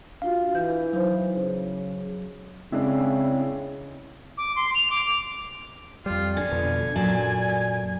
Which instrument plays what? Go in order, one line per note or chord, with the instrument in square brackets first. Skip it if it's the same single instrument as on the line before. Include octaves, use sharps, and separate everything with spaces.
[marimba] D4 F4 F#4 [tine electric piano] F5
[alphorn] E3 [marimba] G6
[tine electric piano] F#3 [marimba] D#4 C5
[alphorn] C#3
[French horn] C#3 [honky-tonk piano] G#3 D4 E4 [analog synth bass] C4
[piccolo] D6
C6
F7
D6
[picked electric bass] F2 G3 [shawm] F4
[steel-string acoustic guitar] D3 [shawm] G#5
[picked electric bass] F2 B2
[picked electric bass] F#2 A#2 [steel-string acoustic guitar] F#3 D5 A5